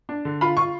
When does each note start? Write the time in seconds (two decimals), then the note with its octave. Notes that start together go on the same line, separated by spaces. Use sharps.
0.09 D4
0.25 D3
0.41 F4 B5
0.57 F4 C#6